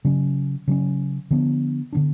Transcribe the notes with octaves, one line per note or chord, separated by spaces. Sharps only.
C#3 F#3 C#4
C#3 F#3 C#4
D3 F3 B3 D4
D3 F3 B3 D4